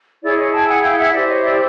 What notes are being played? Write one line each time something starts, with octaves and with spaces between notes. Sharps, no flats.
E4 G#4 C#5 D5
C#5 D#5
G5 A5
F#5 G#5
F5 G5
E5 F#5
E4 G4 C5 D5 E5
C#5 D#5
D5 E5